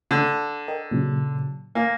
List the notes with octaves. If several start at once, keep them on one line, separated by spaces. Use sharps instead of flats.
D3
A#4 D#5 G5
A#2 C#3 F#3
A#3 G#5